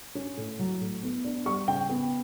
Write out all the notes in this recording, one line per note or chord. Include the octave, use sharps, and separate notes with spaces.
C#4
A2
F#3
A2
B3
D4
G3 C#6
C#3 G5
B3